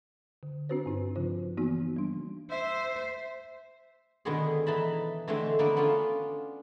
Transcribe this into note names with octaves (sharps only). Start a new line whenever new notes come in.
D3
C4 D4 F#4 B4 C5
G2 D#4
C#3 F3 F4 C5
E3 A#3 B3 D#4 F#4
G3 D4
C5 E5
B2 D3 D#3 G#3 B3 G#4
E3 D#4 A5 B5
D3 E3 G#3 A3 C4
D3 A#3 B3
B3 C#4 D4 F4